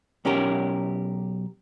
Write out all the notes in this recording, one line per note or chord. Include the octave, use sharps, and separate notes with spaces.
B1 C#4 G4 A#4